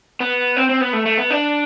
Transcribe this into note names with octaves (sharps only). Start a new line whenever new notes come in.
B3
C4
C4
B3
A3
A3
B3
D4